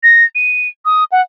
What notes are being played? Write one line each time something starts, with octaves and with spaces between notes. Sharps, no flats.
A#6
D#7
D#6
F#5